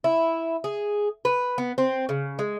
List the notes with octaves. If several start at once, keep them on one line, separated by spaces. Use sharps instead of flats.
E4
G#4
B4
B3
C4
C#3
G#3